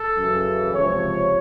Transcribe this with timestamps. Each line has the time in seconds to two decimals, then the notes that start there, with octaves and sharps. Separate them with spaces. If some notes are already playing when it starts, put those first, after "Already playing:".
Already playing: A4
0.17 F#2 C#3 E3
0.74 C#2 C3 F3 C#5